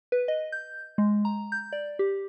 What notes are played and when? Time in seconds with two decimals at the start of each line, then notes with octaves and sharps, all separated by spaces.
0.12 B4
0.28 D#5
0.52 G6
0.98 G#3
1.25 A#5
1.52 G6
1.73 D5
1.99 G4